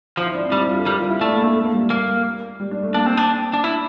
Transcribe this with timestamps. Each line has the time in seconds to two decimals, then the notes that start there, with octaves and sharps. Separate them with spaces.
0.17 F3 F4
0.26 E4
0.35 D4
0.43 C4
0.52 G3 D4
0.61 E4
0.69 F4
0.78 A4
0.86 G3 A#4
0.99 F4
1.10 E4
1.21 A3 D4
1.32 A#3
1.44 A3
1.56 A3
1.65 A#3
1.73 G3
1.90 A#3
2.60 G3
2.71 D4
2.83 A3
2.94 A#3 D4
3.06 C4
3.17 D4
3.53 D4
3.64 E4